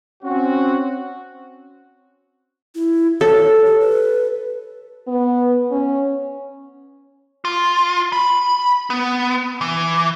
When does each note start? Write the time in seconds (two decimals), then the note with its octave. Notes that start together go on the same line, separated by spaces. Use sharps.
0.23 C4 C#4 F#4
2.75 E4
3.21 A4 C#5
3.66 G4
3.80 B4
5.08 B3
5.71 C#4
7.45 F4
8.12 B5
8.90 B3
9.61 E3